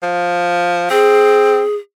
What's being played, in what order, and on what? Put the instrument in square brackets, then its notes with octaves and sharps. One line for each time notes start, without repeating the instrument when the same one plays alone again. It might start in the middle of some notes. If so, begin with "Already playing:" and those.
[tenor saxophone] F3
[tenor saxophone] C4 [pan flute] G#4